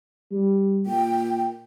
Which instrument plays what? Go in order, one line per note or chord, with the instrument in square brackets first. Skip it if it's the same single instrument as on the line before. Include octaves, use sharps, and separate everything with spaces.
[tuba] G3
[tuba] A#2 [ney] G5